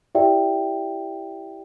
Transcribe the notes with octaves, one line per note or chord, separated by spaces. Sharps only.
E4 G4 D5 E5 G5